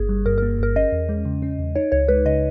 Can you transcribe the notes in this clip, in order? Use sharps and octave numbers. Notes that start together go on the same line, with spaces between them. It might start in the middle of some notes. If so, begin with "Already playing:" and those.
Already playing: G1 A#3 G#4
G3
G2 A#4
A#3 A#4
G1 A#4
C#4 D#5
E2
G#3
C#3
C#4
E2
D#4 C#5
C#2 C#5
G#3 B4
C#3 D#5